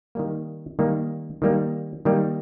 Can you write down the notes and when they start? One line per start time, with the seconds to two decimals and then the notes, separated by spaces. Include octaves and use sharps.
0.15 D#3 G3 A#3
0.79 D#3 G3 A#3
1.42 D#3 G3 A#3
2.05 D#3 G3 A#3